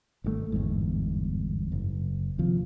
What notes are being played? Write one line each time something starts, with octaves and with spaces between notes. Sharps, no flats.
G#1 D3 A3
G1 E2 G#2
F#1
D#2 C3 F3